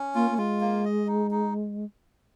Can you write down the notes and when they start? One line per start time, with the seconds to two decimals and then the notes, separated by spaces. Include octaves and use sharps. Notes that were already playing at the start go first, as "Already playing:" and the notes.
Already playing: C#4
0.15 A#3 F4
0.31 A#3
0.38 G#3 F4
0.61 A#3
0.85 D#5
1.08 D#4
1.31 D#4